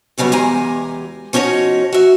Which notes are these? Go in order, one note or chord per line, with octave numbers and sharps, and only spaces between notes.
G2 C#3 F#3 G3 B3
E2 G#3 G4 G#5 A#5
F3 C#4 D#4 F#4 C#5
F#4 E5